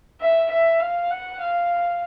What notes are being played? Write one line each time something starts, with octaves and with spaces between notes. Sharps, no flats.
E5
E5
F5
F#5
F5